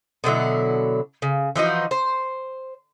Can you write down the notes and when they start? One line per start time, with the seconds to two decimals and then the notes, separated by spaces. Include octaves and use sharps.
0.24 B2 D3 F#3 E4
1.22 C#3
1.56 E3 F3 D#4 F#4
1.91 C5